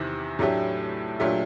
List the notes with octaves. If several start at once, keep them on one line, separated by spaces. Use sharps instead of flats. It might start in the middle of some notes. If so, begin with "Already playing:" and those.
Already playing: E2 C3 D#3
A2 F#3 A3 D4 G4
A#2 F#3 A3 D4 G4